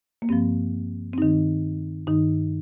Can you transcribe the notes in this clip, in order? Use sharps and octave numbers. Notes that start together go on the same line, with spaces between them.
A#3
G2 F3 C4
C4
G2 D#3 D#4
G2 D#3 D#4